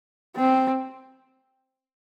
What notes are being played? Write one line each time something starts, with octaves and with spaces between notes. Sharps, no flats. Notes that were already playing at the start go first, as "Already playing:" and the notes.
C4